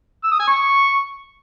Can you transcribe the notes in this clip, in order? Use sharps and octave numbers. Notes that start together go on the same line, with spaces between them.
E6
D#6
G#5
C#6